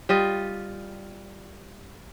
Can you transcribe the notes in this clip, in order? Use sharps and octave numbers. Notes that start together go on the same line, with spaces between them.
G3 F4 D#5